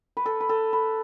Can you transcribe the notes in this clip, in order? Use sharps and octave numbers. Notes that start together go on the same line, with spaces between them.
B4
A4
B4
A4
B4